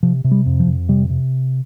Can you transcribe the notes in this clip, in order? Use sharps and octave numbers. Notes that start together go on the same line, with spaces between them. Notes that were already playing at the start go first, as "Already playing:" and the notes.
C3 F3
C3
G3
F2
F3
F2
C3 G3
C3